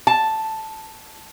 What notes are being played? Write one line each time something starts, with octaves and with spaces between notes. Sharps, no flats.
A5